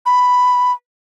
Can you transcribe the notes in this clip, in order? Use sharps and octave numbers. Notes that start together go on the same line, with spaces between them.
B5